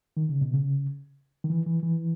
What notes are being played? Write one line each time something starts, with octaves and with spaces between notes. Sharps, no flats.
D#3
C#3
B2
C#3
D#3
E3
E3
E3